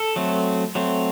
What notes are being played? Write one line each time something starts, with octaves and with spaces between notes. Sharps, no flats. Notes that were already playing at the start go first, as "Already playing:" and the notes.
Already playing: A4
F#3 A3 C4
F#3 A3 C4